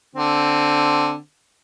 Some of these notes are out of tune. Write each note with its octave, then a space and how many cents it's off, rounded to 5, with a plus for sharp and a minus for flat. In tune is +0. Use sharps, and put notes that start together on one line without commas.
D3 +0 C4 +0